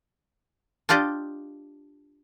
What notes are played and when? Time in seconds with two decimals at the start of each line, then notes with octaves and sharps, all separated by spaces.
0.89 D4 F4 G4 D5 D#5